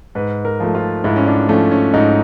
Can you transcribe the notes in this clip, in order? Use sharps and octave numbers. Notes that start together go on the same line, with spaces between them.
G#2 B4
A#4
F3 A3
F4
G#2 E4
C#4
D4
F3 A3 C#4
C#4
G#2 D#4